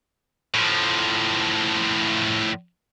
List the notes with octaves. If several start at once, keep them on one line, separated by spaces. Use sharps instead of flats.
A2 F3